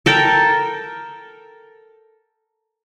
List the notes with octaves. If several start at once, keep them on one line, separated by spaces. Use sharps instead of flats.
A4 A#4 G5